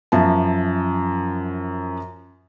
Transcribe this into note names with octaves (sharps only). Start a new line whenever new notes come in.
F#2 F3 E5 A5